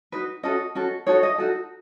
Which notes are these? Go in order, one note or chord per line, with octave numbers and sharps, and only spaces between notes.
D#4 F#4 B4
C#4 F#4 A4 D#5
C#4 F#4 A4
D#4 F#4 A4 C#5
D#5
D#4 F#4 A4